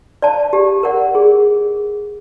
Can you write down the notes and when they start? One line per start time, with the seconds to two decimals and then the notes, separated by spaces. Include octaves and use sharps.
0.22 D5 F5 A5
0.53 G4
0.83 A#4 D5 F#5
1.15 G#4